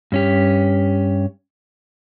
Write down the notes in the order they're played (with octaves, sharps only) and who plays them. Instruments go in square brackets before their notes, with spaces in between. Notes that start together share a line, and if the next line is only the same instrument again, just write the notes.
[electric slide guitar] G2 C#4 G4